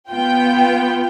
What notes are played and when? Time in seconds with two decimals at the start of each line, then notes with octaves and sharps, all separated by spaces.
0.10 B3 F4 G5